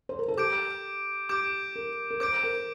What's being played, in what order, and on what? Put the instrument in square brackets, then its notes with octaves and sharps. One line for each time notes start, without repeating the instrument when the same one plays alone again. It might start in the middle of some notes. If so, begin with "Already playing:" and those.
[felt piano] C5
A#4
A4
[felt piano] G4 [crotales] D6 G6 D7
[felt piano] G4 [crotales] D6 G6 D7
[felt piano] A#4
A#4
[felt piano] C5 [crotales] D6 G6 D7
[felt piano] A#4